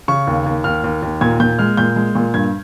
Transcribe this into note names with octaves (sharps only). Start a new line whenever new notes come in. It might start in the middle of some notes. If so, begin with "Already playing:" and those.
C#3 C#6
D#2
D#2
D#2 F6
D#2
D#2
A#2 G#6
A#2 G6
G#3 F6
A#2 G6
G#3
A#2
G2 G#6